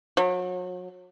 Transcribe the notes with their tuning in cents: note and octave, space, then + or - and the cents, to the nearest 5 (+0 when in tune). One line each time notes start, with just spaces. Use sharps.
F#3 -35